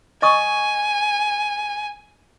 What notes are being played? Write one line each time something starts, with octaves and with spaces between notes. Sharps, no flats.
D#5 G#5 C#6 D#6